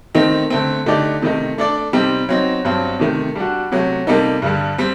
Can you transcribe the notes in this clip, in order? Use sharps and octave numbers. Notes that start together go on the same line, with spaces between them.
D#3 A3 C4 D#4
D3 A3 C4
D3 A3 D#4 G4 D5
C3 D#3 A3 D#4
A3 D4 A4 D5
C3 G3 C4 D#4
F#3 C4 D#4
G2 F#3 C4
C3 D#3 A3
G3 D4 F#4
C3 F#3 A3
C3 G3 A#3 D#4 A4
G2 D3 G3
G3 C4